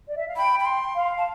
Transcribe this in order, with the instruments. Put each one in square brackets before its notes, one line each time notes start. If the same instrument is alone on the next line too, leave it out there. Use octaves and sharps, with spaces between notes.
[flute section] D5
E5
F5
[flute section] G5 [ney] B5
[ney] B5
C6
[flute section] F5
[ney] A5